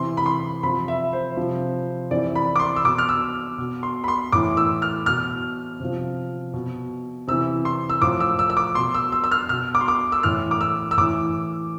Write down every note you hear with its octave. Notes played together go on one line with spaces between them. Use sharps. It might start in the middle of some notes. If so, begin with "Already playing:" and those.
Already playing: C3 E3 C6
B5
C6
C3 F3 B5
E5
C5
C3 F3
C3 E3 D5
B5
D6
C6
E6
B2 D6
F6
E6
B2
C6
B5
C6
A2 E3 D6
E6
F6
B2 F6
C3 F3
B2
C3 E3 E6
C6
E6
A2 F3 D6
E6
E6
E6
D6
B2 C6
E6
E6
E6
F6
B2 F6
D6
C6
D6
E6
A2 E3 F6
D6
E6
E6
A2 E3 D6